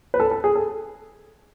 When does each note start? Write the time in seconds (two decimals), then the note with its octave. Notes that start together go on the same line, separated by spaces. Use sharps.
0.14 B4
0.20 A4
0.31 A4
0.44 G#4
0.55 A4